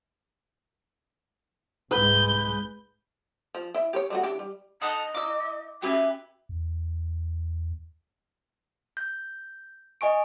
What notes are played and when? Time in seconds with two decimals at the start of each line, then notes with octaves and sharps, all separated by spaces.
1.91 C2 G#2 G#3 B4 G6
3.55 F3
3.74 E4 E5
3.93 G4 B4 C#5
4.10 G3 A3 F#4
4.23 E3 D4 G4
4.39 G3
4.82 D#4 A4 D#5 F#5 D#6
5.14 E4 D5 F5 D6 E6
5.82 C#4 F#4 G4 B4 E5 G#5
6.49 E2
8.97 G6
10.01 D#5 G#5 C#6 D7